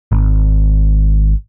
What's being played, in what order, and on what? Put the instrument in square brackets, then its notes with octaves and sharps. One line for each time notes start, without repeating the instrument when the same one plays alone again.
[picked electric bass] G#1